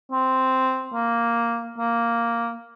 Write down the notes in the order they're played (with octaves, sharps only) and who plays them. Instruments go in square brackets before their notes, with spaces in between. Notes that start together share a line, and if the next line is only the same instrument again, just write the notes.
[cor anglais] C4
A#3
A#3